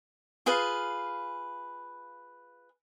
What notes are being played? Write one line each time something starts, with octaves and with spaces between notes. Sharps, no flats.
F4 G#4 B4 F5